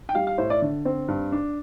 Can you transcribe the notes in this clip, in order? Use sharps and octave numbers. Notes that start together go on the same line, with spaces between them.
G5
G3 F5
F5
A2 C5
D5
D3
C4
G2
D4